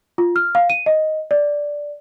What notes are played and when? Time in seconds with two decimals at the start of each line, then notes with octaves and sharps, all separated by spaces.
0.18 F4
0.36 F6
0.55 F5
0.70 D#7
0.86 D#5
1.31 D5